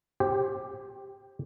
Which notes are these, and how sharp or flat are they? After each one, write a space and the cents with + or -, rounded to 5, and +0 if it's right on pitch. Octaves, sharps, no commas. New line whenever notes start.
G4 +5 C5 +30